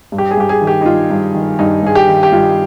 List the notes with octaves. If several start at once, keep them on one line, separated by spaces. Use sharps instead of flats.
G2
G4
G#4
G2 G4
G#4
D#3
G4
D#4
G2 F4
G2
D#3
G2 D#4
G2 G#4
G4
D#3
G4
G2 F4